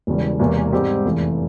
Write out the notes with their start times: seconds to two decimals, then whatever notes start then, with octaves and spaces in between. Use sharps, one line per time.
0.07 E1 E2 C#3 G3
0.39 E1 E2 C3 E3 A#3
0.72 G#2 G3 C4 G4
1.05 F1 E2 E3